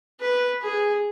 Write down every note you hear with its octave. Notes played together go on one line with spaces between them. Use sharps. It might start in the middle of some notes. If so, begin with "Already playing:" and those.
B4
G#4